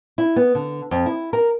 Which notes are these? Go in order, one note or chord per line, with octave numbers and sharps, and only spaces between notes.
E4
B3
D3
F2
E4
A#4